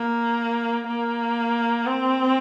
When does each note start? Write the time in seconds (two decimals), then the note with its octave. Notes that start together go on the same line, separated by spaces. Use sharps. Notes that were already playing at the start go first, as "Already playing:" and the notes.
Already playing: A#3
0.87 A#3
1.86 C4